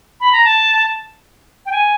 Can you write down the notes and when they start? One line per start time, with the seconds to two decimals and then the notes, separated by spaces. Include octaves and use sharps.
0.20 B5
0.32 A#5
0.45 A5
1.66 G5
1.72 G#5